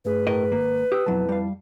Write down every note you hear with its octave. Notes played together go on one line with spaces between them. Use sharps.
G2 A3 G#4 B4
A2 A#4 D#5
G#1 A#3
G4 D#6 E6
B1 F2 F#3 E4 A5
G3 F5